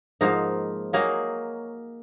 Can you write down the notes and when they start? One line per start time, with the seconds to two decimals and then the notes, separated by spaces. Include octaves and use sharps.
0.21 G#2 F3 A#3 D#4
0.93 F#3 A#3 D#4 G#4